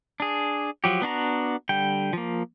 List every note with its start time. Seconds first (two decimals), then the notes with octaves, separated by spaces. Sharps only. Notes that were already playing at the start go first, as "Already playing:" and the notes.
0.20 D4 G#4
0.84 F3 F#3 G4
1.02 B3 D4 F#4 A#5
1.69 D3 G3 G5
2.13 F3 A#3